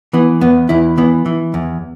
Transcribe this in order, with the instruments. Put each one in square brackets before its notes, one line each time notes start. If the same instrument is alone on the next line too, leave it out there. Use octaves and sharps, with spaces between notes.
[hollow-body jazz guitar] E3 B3
E2 B3
E2 E4
E3 B3
E3
E2